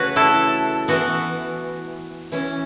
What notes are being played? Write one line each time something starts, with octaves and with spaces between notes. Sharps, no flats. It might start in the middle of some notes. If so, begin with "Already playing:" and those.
Already playing: C#3 E3 A3 F#4 B4 C#5
E4 A4
E3 B3 F#4
E3 C#4